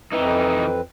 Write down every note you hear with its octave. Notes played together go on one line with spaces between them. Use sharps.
F2 E3 C4 D#4 B4